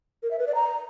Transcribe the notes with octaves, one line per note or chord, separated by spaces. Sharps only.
A#4
E5
B4
D5
A#5